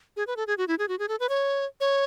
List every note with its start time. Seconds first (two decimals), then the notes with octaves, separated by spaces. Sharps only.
0.16 G#4
0.27 B4
0.37 A4
0.47 G#4
0.58 F#4
0.68 E4
0.79 G#4
0.88 F#4
0.99 G#4
1.08 A4
1.20 B4
1.29 C#5
1.80 C#5